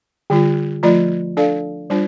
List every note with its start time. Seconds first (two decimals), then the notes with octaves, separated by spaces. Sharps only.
0.30 D3 G3 F4
0.83 F3 A3 F4 D5
1.37 D4 A4 D5 F5
1.90 G3 D4 F4 C5